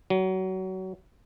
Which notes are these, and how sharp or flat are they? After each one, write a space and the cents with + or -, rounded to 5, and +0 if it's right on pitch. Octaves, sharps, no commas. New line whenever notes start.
F#3 +25